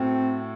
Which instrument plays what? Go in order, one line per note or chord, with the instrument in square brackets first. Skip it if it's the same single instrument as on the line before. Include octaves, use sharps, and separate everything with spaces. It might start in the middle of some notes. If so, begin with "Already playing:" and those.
Already playing: [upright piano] A2 A3 F#4 [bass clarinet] C4